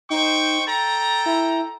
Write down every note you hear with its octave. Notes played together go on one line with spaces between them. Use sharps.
D#4 C5 G5 C#6
A4 G5 A#5 A6
E4